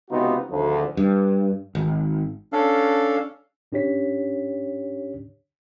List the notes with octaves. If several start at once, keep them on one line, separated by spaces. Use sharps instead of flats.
C#2 C3 B3 D#4 F4 F#4
G#1 D2 F3
G2
G#1
C#4 D4 A4 F5
G#2 C#4 D4 G4 C#5 B6